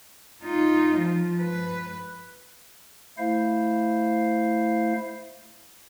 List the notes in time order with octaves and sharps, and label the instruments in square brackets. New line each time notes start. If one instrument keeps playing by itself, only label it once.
[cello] D#4 F4
F3
B4
[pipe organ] A3 E4 C5 F5